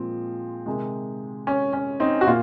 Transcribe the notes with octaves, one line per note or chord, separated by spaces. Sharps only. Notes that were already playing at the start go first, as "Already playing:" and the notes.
Already playing: A#2 F3 G#3 C4
C3 D#3 G#3
C#4
C#4
C4 D#4
F#4
A#2 F4